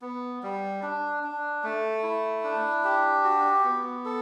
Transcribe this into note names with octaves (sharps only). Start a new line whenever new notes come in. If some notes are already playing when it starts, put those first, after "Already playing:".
B3
G3
D4
D4
A3
E4
D4
G4
F#4
B3
A4